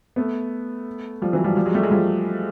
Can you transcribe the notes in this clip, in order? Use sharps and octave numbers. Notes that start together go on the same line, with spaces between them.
A3 B3
F3 G3
E3 F#3
F3 G3
F3 G3
F#3 G#3
G3 A3
F#3 G#3
F3 G3